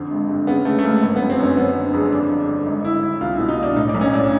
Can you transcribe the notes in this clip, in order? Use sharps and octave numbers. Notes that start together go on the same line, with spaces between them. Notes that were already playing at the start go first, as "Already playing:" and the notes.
Already playing: F2 D3 C4
G#1
G2
C#3 B3
C#3 A3
A3
G#1 A#3
G1
B3
F#2
C4
F#2 C#4
F#1 B3
D3
F2 G#3
G2 D4
D3
G1
G#1 D#4
D3 E4
D3 E4
C2 F4
B2 E4
D#4
B2 D4
A2 D#4
D4
B1
C#4
A2 D4